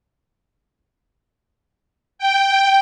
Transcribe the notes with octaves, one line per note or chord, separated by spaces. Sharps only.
G5